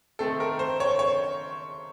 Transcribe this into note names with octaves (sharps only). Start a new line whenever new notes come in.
D#3 A3 C4 A4
A#4
C5
C#5
C#5